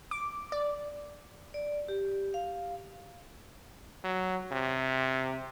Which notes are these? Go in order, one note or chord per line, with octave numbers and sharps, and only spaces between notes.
D6
D5
D5
G4
F5
F#3
C3